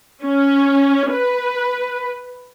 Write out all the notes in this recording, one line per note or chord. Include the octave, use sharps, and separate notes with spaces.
C#4
B4